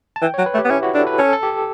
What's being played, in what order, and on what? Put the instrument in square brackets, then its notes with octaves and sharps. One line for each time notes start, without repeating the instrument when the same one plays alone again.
[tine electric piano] A5
[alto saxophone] E3 [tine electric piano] G5
[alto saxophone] F#3 [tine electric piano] C#5
[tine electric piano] B4
[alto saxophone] A3
[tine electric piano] G4
[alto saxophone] B3
[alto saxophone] C#4 [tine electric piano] E4
[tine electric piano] F#4
[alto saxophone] D4 [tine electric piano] A4
[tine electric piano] B4
[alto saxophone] C#4 [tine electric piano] A4
[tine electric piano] A4
G4